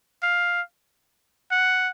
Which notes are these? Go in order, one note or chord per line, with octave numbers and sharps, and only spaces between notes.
F5
F#5